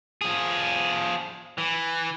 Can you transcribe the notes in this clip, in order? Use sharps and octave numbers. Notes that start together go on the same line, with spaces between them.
F3 G#4
E3